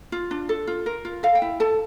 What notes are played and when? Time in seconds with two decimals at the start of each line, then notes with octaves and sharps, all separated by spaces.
0.12 F4
0.31 D4
0.49 A4
0.67 F4
0.86 A#4
1.05 F4
1.23 A4 F5
1.35 G5
1.42 E4
1.60 A4 A5